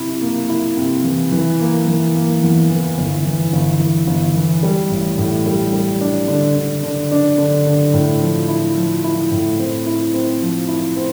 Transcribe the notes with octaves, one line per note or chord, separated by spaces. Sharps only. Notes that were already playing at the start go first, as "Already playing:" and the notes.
Already playing: C3 E4
A#3
E4
C3
E3
E3
A#3
E3
A#3
E2
E3
G1
E3
G1
E3
G1
E3
G3
A1
A2
G3
G3
D4
D3
D3
D3
D4
D3
D3
A2
F3
E4
F3
E4
A2
C4
E4
C4
F3
E4
C4